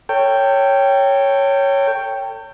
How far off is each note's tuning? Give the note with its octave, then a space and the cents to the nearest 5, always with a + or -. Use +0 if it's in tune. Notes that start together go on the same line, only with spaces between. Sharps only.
A4 +40 C#5 +0 G5 +0